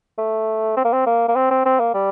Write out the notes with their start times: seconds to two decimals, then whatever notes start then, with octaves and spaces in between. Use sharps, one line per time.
0.18 A3
0.77 C4
0.85 A#3
0.93 C4
1.07 A#3
1.28 A#3
1.36 C4
1.51 C4
1.65 C4
1.80 A#3
1.94 G3